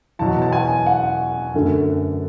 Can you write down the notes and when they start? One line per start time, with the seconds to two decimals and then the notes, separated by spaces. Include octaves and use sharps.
0.19 E2 B2 F#3 A5
0.42 A5
0.52 G#5
0.86 F#5
1.54 F#2 D3 A3